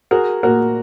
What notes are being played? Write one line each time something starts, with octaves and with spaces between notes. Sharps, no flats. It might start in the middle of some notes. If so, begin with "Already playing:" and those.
F#4 G#4 A#4
A#2 F#4 A#4